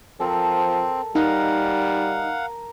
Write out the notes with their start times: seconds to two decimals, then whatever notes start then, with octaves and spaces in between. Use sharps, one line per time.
0.20 F3 C4 A4 A#4
1.15 G3 D#4 A#4 F5 F#5